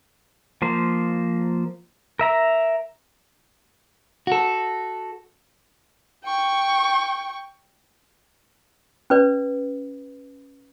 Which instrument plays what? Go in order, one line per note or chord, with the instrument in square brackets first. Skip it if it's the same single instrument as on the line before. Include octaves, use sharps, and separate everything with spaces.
[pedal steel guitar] F3 A#3 C5
A#4 E5 A#5
[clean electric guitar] F#4 A4
[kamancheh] G5 C#6
[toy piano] C#4 B4 D5